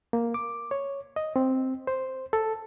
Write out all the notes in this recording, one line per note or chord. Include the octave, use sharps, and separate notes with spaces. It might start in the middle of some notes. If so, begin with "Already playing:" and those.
A#3
D6
C#5
D#5
C4
C5
A4